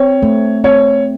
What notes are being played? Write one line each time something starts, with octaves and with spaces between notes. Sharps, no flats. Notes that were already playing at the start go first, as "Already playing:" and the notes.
Already playing: C4 C#5
A3
C4 C#5